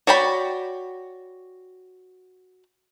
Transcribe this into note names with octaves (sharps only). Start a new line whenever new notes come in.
F#4 C#5 D5 G5 B5